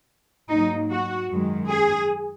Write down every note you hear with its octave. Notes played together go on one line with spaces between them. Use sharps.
G#2 F#3 A#3 D#4
F#4
F#2 D#3 G#3
G#4